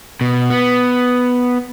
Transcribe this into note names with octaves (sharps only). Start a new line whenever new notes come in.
B2
B3